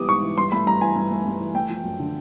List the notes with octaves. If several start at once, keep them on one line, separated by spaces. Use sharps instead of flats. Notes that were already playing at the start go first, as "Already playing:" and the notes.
Already playing: E3 G3 B3 D6 D#6
G#2 C#6
E3
G2 C6
A3 B5
G2 A#5
E3 G#5
G2
A3
G2
E3
A3 G5
F3
F#2
D3